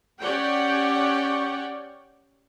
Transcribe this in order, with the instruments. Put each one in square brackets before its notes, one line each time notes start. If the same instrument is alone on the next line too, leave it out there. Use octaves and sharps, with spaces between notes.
[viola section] C#4 G4 C#5 D5 F#5 G5